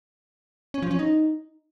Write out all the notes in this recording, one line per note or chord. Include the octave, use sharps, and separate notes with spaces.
C#4
F3
C#4
D#4